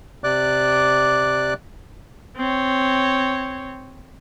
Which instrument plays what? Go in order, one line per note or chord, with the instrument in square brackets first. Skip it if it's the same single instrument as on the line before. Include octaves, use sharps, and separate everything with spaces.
[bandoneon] C3 D5 D6 F#6
[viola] C4 C#5